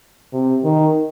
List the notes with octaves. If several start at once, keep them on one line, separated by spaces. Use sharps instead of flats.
C3
D#3